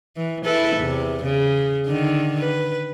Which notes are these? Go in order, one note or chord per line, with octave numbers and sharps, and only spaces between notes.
E3
E4 A4 B4
E2 C3
C#3
D3 D#3
B4